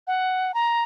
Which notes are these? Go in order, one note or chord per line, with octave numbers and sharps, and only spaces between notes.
F#5
A#5